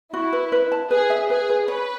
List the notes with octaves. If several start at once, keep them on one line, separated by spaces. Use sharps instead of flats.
E4 F#4
B4
B4
A5
G#4 B4
E5
G#4 B4
B4
B4 C#5